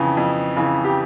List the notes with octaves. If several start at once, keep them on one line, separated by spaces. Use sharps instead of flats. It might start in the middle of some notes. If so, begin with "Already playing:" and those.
Already playing: F2 C#3 E3
F2
C#3 E3
G4